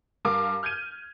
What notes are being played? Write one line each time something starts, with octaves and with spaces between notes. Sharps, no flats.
G2 A#4 F5 D6
F6 G6 G#6 D#7